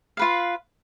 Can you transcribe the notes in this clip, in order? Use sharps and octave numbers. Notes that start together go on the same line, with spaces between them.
F4 B4 F5